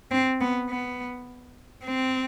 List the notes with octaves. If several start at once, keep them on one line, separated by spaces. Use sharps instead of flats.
C4
B3
B3
C4